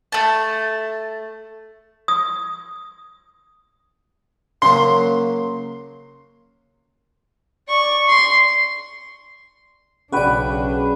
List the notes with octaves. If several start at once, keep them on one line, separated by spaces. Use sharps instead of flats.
A3 A5
D#6
C#3 F#3 A#3 C6
D5 C#6
C6
B1 C#3 D4 F#4 G#4 B4 D5 G5